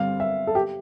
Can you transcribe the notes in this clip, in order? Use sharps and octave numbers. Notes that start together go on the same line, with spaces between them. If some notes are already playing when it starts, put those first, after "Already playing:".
Already playing: G2 D3 G3 C4 F5
E5
A4
G4